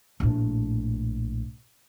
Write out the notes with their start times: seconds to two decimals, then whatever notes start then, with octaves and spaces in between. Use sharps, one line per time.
0.20 A#1 A2